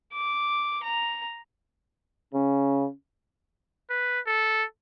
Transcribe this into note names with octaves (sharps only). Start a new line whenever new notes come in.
D6
A#5
C#3 C#4
B4
A4